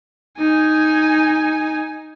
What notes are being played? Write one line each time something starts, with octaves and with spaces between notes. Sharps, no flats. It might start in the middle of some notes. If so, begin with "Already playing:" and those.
D#4 G#5